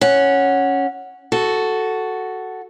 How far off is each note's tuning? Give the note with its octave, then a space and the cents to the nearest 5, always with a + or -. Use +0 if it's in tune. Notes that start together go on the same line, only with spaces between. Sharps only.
C#4 +0 F#5 +0
F#4 +5 A4 +0